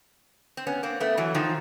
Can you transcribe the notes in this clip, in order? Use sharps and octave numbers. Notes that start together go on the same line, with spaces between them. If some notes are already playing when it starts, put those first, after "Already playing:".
C4
B3 C#4
A#3 C4
A3 B3
E3 F#3
D#3 F3